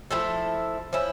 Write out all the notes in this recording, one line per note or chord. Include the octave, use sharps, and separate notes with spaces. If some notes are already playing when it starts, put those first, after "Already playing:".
F3 A3 E4 A4
F3 C#4 E4